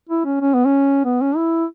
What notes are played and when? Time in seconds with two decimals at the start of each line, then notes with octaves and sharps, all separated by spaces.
0.09 E4
0.25 C#4
0.41 C#4
0.54 B3
0.65 C#4
1.05 B3
1.21 C#4
1.36 E4